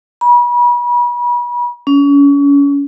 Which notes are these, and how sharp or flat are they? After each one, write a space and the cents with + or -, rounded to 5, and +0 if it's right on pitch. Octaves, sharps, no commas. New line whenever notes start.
B5 -35
C#4 +35